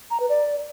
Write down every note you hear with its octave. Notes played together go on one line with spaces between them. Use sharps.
A#5
B4
D5